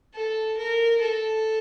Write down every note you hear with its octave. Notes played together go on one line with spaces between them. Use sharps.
A4
A#4
A4